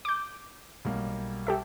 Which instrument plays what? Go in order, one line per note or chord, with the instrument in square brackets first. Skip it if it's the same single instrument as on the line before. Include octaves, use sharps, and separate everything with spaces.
[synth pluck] D6 G6
[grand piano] B1 G3 A#3
[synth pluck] G4 A4 E5